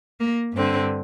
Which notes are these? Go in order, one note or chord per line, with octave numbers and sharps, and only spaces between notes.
A#3
G2 D3 C4